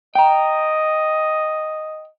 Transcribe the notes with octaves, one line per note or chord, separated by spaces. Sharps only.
D#5 G5 A#5